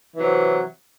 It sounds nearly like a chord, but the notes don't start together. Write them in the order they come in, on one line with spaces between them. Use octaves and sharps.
E3 F#3 C3